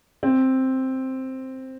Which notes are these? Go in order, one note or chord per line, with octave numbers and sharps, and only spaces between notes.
C4